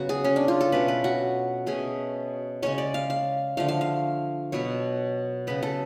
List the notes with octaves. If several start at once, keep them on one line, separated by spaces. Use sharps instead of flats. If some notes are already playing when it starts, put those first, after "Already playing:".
Already playing: C#3 F#3 B3 F#4
G#4
C#4
D4
F4
A4
B2 A3 C#4 B4
B4
F#4
B2 A3 C#4 G#4
C#3 G#3 C#4 C#5
D5
F5
F5
D3 F3 A3 F5
F5
F5
B2 F#3 B3 C#5
C#3 F#3 B3 B4
A4